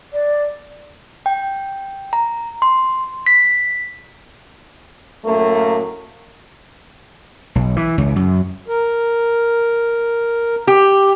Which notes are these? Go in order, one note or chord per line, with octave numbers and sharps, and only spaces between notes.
D5
G5
A#5
C6
B6
F#2 A2 A3 A#3
B1
E3
C#2
F#2
A#4
G4